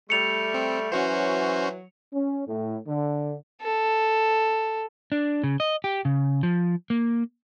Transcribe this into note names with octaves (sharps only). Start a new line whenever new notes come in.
G3 A3 C#7 F7
C4
E3 F#3 C#4 F#4 C5
C#4
A2
D3
A4
D4
C#3
D#5
G4
C#3
F3
A#3